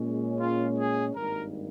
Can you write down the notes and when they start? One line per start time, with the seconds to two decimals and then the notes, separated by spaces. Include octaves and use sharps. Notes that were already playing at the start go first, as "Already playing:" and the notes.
Already playing: A#2 G#3 C#4
0.40 F4
0.78 G#4
1.15 G#1 G2 G3 A#3 D#4 A#4